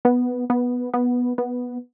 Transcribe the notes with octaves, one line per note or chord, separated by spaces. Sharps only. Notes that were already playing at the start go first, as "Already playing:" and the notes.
B3
B3
B3
B3